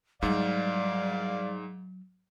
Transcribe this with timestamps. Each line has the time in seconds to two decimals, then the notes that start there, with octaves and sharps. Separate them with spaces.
0.22 G#2 F#3 G3 D5 F5